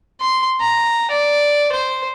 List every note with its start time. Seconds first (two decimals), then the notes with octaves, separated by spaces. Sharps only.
0.21 C6
0.61 A#5
1.11 D5
1.73 C5